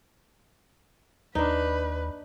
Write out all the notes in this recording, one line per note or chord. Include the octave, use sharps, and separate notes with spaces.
D#2 D4 D#4 B4